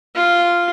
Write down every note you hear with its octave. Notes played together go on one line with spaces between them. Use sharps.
F4